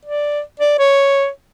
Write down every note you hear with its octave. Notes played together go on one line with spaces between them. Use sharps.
D5
D5
C#5